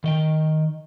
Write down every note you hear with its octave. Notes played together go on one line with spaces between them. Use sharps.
D#3 D#5 G5